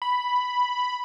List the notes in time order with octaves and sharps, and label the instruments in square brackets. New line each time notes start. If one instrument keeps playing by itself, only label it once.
[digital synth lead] B5